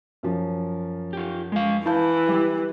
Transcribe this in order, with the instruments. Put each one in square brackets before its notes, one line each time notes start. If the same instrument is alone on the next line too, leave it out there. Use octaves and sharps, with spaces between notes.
[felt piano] F#2 F3
[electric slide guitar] F4 G4
G#3 F5
[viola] E3 [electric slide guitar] E4 [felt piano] F5 A5 G6
[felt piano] G3 G4